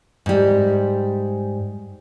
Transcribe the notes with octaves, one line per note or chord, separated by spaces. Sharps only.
G#2 G3